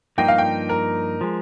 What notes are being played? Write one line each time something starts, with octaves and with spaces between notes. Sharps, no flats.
G2 F3 A#3 D#4 G5
F5
G5
A#4
F3 G#3